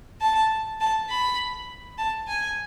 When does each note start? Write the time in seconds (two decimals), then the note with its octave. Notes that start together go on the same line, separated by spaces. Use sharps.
0.21 A5
0.80 A5
1.10 B5
1.98 A5
2.28 G#5